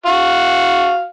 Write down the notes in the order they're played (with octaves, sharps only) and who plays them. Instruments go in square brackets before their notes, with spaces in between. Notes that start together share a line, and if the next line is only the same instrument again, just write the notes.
[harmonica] F#4 F5